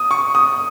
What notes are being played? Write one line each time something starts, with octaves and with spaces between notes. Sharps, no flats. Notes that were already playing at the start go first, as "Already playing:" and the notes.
Already playing: D#6
C#6
D#6